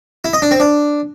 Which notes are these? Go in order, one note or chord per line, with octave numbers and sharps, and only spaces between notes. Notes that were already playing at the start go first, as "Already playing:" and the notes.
E4
D#5
D4
C4
D4